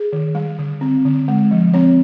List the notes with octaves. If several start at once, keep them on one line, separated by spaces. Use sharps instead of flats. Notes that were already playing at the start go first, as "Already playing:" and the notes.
Already playing: G#4
D#3
G3
D3
C4
D3
G#3
F3
C4 C#5